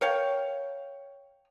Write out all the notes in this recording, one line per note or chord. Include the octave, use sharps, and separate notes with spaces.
A#4 C#5 F5 G5